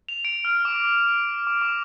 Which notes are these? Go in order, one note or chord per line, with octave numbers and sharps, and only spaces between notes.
F7
D7
F6
D6
D6
D6